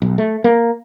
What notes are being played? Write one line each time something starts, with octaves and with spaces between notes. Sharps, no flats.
B1
A3
A#3